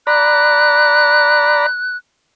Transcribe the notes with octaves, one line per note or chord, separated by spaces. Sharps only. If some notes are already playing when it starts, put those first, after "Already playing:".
D5 A#5 B5 F#6